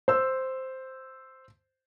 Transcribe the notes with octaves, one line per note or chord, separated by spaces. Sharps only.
C5 E6